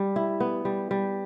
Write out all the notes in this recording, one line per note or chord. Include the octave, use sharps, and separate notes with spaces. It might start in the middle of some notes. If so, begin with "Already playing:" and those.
Already playing: G3
E4
B3
G3
G3